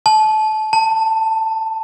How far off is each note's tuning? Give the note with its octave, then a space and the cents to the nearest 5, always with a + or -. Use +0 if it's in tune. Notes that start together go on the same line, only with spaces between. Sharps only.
A5 -25
A5 +15